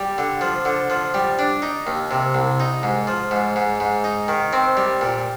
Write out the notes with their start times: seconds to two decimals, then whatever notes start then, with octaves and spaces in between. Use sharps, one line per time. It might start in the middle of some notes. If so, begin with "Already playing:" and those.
Already playing: G3
0.18 D3
0.41 F3
0.65 D3
0.90 F3
1.14 G3
1.39 D4
1.62 D#4
1.87 D#2
2.11 C3
2.35 C2
2.60 D#4
2.83 G#2
3.07 F3
3.31 G#2
3.56 G#2
3.80 G#2
4.04 D#4
4.28 D#3
4.53 C4
4.77 G3
5.01 A#2